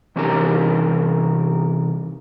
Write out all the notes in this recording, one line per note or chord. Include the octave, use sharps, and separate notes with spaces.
C3 E3 C#4 D#4 G4 A#4